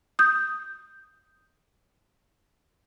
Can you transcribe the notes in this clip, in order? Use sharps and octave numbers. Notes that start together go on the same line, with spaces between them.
D#6 G6